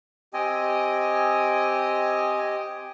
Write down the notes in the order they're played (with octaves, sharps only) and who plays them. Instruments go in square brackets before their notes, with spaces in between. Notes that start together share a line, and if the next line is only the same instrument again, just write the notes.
[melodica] C4 G#5 [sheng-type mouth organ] G4 D#5